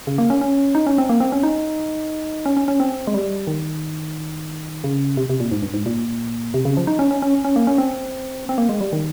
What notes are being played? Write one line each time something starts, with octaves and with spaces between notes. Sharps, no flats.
C#3
A#3
C#4
C#4
D#4
C#4
C4
A#3
C4
C#4
D#4
C#4
C#4
C#4
C4
G#3
G3
D#3
C#3
C3
C3
A#2
G#2
G2
G#2
A#2
C3
C#3
F3
D#4
C#4
C#4
C#4
C#4
A#3
C#4
C4
C4
A#3
G#3
G3
D#3